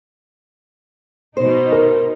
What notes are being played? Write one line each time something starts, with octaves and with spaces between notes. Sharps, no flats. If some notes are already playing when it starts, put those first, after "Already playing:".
B2 D#4 C5
A#4